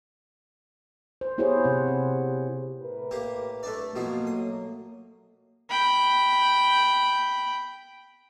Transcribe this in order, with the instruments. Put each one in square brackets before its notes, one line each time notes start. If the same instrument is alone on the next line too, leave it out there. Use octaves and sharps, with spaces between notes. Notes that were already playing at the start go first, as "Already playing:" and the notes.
[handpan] C5
B3 E4 G4 G#4 C5 C#5
C3 C4 F#5
G4
[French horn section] A2 A#4 B4
[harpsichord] A#3 G4
A3 D4 D5
[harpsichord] B2 F3 F#3 [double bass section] A#3
[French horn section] F#3 A3 [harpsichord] D#6
[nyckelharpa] G5 B5